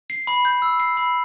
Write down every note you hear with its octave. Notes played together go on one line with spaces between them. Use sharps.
C7
B5
G6
E6
C7
B5